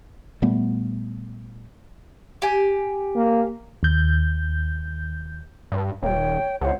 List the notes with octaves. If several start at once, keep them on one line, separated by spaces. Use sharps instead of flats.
A#2 G3 A3 B3
G4 G#5
A#3
D#2 G6
G2
D#1 C#5 G5
C#2 C5 C#5 F#5